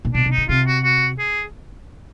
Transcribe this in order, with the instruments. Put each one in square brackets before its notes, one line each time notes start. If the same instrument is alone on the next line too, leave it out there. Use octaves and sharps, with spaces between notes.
[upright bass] A#2
[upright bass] B2 [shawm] D4
[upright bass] C3
[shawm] D#4
[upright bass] C#3
[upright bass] C3 [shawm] F4
[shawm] F#4
F#4
G#4